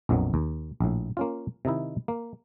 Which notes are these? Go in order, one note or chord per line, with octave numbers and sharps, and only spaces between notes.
A#1 F2 B2 F#3 A#3
D#2
A#1 A2
A#3 C#4 F4
C3 D#3 D#4 E4
A#3